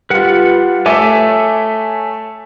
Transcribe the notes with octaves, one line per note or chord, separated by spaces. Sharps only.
G3 F4 B4 F#5
A3 A4 C#5 E5 G#5 D6